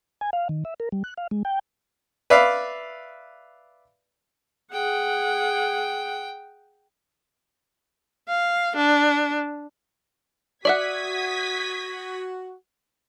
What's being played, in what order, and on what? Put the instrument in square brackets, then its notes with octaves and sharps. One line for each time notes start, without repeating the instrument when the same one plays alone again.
[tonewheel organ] G#5
F5
D#3
E5
A#4
G3
F#6
F5
G#3
G5
[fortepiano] B4 D5 E5 F5
[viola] G#4 F#5 [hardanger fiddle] G5
[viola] F5
D4
[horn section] F#4 [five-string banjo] D5 E5 F#5 [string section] D#6 G#6 B6